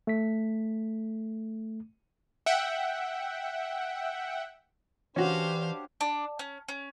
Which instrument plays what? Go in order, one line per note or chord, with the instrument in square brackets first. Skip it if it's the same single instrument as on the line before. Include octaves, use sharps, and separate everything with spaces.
[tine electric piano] A3 B6
[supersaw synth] E5 F#5 G5
[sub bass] E3 [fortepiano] C#4 F#4 [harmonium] D4 G4 [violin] C5 F5
[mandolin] D4
C#4
C#4